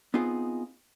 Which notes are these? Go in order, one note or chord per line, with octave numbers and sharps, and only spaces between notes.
B3 C4 D#4 F4 G#4